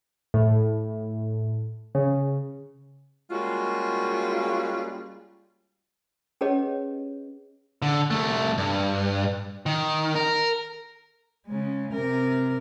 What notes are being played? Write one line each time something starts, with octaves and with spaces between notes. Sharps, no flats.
A2
C#3
G3 G#3 A#3 C#4 F4 F#4
C#4 G4 G#4 B4 C#5 D#5
D3
C2 A3
G2
D#3
A#4
C#3 G#3
C3 A#4